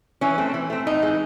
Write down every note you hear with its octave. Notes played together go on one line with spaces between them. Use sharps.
E3 C#4
A3 C4
E3
A3 C4
A2 D#4
E3 G#3